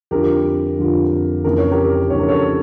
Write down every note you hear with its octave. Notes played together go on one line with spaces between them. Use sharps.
F2 D3 G3 D4 F4 G4 A#4
F2 D3 G3 D4 F4
F2 C#3 E3 A#3 D4 A#4
C#5
G4 A#4
F2 C#3 E3 A#3 D4 C#5
A#4
A4 C#5